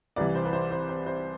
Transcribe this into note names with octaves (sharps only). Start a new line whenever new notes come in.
C2 C3 E3 B4 D5
C5
B4
C5
C5
C5
C5